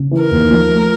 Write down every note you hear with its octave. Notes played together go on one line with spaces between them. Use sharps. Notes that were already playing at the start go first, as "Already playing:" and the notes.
Already playing: C#3
E3
A#4
D#2
F3
A3